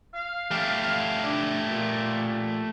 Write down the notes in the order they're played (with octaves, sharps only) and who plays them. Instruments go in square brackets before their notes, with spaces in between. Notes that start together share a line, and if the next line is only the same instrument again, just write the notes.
[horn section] F5
[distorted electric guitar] A3 G4
[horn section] D4
A#2